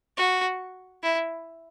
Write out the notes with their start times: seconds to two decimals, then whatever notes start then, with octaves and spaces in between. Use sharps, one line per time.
0.17 F#4
1.03 E4